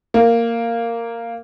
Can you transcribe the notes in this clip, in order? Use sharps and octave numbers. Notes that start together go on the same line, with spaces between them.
A#3